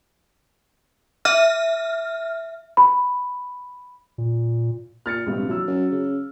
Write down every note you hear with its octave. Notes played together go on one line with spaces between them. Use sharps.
E5 F6
B5
A#2
A#2 F6 A6 C#7
E1 A#1 G2 C3
E3 F#3 E6
F#2
C#3